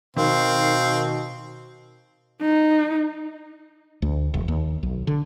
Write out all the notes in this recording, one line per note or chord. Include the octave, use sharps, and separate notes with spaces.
B2 D#3 C4 F5
D#4
D2
E1
D#2
B1
D3